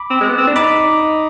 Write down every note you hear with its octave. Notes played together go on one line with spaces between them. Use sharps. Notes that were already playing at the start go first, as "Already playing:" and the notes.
Already playing: B5 D6
C4
G#3
B3
C4
D4
D#4 B5 D6